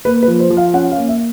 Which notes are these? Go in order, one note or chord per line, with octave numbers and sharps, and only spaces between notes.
A#3 B4
B4
F3
C5
F3
F5
C#4 F#5
F5
A#3
E5